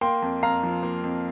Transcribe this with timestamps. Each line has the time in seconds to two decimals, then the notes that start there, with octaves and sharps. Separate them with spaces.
0.01 A#3 G5 C6
0.22 F2
0.43 F2 F5 A#5
0.63 F3
0.83 A#3
1.04 F2